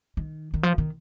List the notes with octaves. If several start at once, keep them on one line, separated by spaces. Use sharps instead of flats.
D#3
D#3
F3
D#3